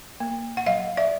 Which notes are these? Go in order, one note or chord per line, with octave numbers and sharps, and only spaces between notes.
A#3
F#5
F#3 D#5 F5
D5 E5